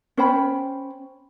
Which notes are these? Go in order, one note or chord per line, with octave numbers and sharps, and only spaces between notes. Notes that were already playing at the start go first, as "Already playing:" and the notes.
C#4 C5 G5 B5